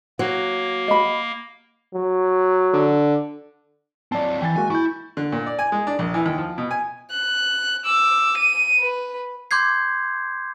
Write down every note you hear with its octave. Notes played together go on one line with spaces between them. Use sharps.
F#3 A#3
D#5 B5
F#3
D3
F#3 C4 D5 A5
E3 G5 G#5 A6
G#3 A#3 F#4 G#5
E4 C#6 G6
D3
A#2
D5
G#5
G#3
D4
A#1
E3
D#2
F3
B2
G#5
F#6
D6 E6
D#7
B4
C6 D6 G6 G#6 C7